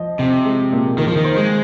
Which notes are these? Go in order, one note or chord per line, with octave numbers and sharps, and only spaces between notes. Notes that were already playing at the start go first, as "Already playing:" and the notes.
Already playing: F3 D#5
C3 C4
G#3
A#2
D#3 A#3
F3
D#3
C5
G#3